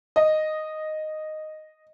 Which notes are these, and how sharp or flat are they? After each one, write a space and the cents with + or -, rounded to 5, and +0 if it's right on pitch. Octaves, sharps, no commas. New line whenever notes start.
D#5 -5